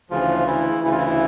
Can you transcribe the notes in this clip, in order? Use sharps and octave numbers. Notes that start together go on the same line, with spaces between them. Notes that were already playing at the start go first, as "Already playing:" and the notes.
D2 C#3 E3 F3 F4
E3 E4
D2 C#3 E3 E4
F4
E3 E4